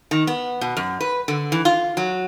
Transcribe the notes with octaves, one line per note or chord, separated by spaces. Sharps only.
D#3
B3
B2
F#2
B4
D3
E3
F4
F#3